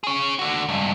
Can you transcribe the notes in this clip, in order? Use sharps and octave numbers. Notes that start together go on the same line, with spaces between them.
G#4 C#5
D3 F#4
C#2 G2